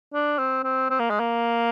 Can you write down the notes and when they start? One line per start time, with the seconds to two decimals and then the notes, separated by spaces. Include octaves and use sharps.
0.14 D4
0.38 C4
0.64 C4
0.90 C4
0.99 A#3
1.10 G#3
1.20 A#3